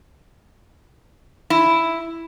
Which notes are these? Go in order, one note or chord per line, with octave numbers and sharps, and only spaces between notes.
E4